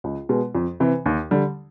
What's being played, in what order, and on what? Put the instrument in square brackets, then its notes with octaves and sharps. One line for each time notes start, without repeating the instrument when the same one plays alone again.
[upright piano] C#2
B2 G#3
F2
C3 E3
D#2
D3 G3